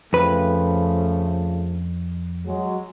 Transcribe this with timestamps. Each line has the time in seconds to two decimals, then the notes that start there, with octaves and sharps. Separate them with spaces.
0.13 F2 C#3 F3 A3 B4
2.46 F#3 G#3